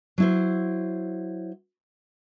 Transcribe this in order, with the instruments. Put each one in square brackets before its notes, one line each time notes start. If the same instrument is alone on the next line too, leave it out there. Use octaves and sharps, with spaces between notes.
[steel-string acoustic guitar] F#3 E4 C5